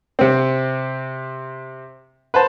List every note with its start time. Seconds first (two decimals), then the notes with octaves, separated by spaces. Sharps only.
0.19 C3 C4
2.34 B4 C5 A5